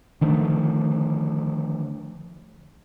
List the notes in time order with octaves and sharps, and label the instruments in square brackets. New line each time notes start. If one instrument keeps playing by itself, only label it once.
[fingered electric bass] D3 D#3 F3 A3